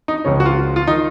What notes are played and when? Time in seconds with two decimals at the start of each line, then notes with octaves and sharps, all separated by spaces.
0.08 D#4
0.24 C#2 C#3 F3 C#4
0.40 F#4
0.46 F4
0.76 F4
0.87 D#3 D#4